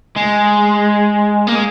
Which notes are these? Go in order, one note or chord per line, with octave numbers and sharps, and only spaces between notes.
G#3
A#3
G#3